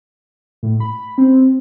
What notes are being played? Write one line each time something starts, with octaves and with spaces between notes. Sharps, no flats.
A2
B5
C4